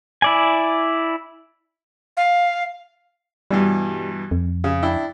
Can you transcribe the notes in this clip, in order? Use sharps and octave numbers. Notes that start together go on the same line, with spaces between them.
E4 D5 G#5
F5
G2 B2 E3 G3
F2
C#3
D4 E4 G5